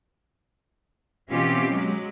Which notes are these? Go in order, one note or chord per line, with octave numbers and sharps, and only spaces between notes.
B2 E3 C4 C#4 F4 G4
F#3 G#3